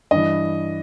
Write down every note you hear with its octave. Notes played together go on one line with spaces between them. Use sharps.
G2 E3 D#5